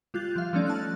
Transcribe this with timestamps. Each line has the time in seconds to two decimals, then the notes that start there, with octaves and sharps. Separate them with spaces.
0.14 G3 F4 F#6 G6 A6
0.36 F3 F5
0.53 F3 G3 A3 C#4 D#4 D5
0.66 A5 F6 F#6